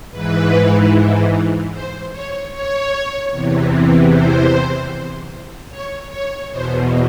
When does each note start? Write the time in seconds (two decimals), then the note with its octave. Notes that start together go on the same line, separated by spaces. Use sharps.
0.11 G#2 E3 B4
1.72 C5
2.12 C#5
2.52 C#5
3.31 E2 C3 E3
4.11 C5
5.70 C#5
6.10 C#5
6.51 E2 B2 C5